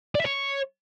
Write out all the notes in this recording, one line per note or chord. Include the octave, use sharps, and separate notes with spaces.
D5
E5
C#5